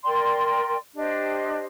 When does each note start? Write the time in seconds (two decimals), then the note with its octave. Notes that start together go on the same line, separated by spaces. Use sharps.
0.03 A#4 D5 G5 C6
0.94 D4 G4 C5 D#5